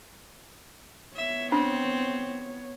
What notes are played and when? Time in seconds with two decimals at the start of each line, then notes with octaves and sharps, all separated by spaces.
1.17 B3 C#5 E5
1.52 C4 D4